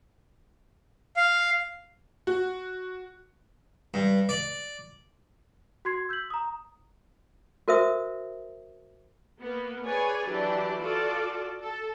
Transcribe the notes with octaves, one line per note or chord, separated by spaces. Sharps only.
F5
F#4
G2
D5
F#4 C6 G#6 C7
E6 G6 B6 F#7
A#5 D#6
F#4 A#4 C5 E5 D#6
A#3 B3
G#4 B4 C#5 D5 G#5
E3 F#3 D4 G4 D5
F4 F#4 A4 D5
A4